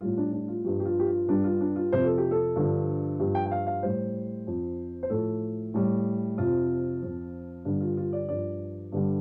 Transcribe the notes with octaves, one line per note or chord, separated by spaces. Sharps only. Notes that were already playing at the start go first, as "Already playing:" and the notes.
A2 G3 F4
D4
D4
F4
G2 F3 G4
G4
F4
G4
F4
G2 G3 D4
F4
D4
F4
F2 C3 F3 C5
A4
G4
A4
G2 D3 F3
G2 F3 G4
G5
G5
F5
F5
A2 G3 C5
F2 F3
C5
A2 F3 A4
A2 G3
F2 C3 F3 F4
F2 F3
G2 D3 G3 D4
F4
F4
D5
G2 F3 D5
G2 D3 G3